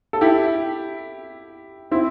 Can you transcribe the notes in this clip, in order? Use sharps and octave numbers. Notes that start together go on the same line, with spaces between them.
A4
E4 G4
C4 E4